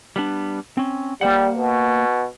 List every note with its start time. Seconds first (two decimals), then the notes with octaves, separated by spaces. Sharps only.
0.16 G3 B3 D4
0.77 C4 C#4
1.21 G3 A#3 C5 F#5
1.57 B2